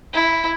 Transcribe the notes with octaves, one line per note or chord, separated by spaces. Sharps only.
E4